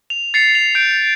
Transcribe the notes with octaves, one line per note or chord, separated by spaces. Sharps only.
F7
A6 C7 C#7 F7
F7
G6 D7